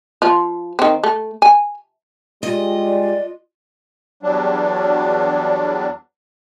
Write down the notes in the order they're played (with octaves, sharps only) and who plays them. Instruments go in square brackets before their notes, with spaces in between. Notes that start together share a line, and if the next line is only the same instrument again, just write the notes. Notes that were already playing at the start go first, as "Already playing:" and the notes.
[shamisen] F3 F4
D#3 C4
A3
G#5
[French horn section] G3 G#3 [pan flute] F4 [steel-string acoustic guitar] D#5
[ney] D5
[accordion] E2 F#3 G3 D4